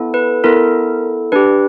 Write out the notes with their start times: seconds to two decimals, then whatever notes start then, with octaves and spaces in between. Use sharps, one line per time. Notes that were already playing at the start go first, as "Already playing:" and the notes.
Already playing: B3 E4 A4
0.14 B4
0.44 B3 E4 A4 A#4
1.32 D4 G4 B4